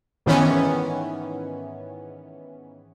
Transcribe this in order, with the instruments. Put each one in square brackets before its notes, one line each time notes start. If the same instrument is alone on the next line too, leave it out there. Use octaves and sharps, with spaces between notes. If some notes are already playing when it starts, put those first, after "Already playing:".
[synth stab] G#2 D#3 E3 B3 C#4